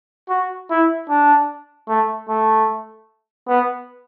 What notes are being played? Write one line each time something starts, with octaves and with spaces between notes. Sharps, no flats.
F#4
E4
D4
A3
A3
B3